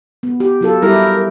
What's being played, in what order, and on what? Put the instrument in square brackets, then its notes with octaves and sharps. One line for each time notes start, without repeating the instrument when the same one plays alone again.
[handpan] B3
G4
F#3 F4 A4
[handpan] G3 E4 G4 [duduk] A#4